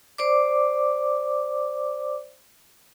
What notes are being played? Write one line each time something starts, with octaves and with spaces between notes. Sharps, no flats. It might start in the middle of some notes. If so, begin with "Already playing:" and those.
C5 D5 D6